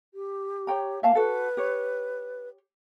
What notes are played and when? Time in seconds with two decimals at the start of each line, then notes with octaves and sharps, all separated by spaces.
0.14 G4
0.67 C#5 G5 A#5
1.03 A#3 E5 F5 A5
1.15 F#4 A4 B4
1.57 G4 C#5